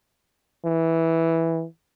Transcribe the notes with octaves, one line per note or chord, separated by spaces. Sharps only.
E3